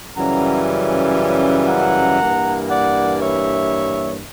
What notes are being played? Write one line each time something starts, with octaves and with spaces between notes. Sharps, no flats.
F#2 C#3 E3 G3 C#4 F#5 A#5
F#5 A#5
G2 E3 A#3
D5 F#5
C#5 E5